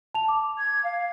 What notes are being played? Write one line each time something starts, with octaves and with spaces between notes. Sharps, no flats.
A5 F7
D6
G#6
F5